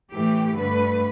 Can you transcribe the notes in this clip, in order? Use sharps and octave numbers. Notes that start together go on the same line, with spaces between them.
A2 E3 A3 G4
G2 D3 A3 B4